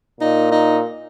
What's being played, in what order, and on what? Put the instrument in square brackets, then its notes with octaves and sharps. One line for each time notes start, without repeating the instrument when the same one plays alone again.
[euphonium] A#2 [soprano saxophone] D#4
[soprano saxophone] D#4